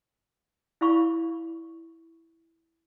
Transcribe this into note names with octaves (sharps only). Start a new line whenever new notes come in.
E4 D5 F5 B5 C#6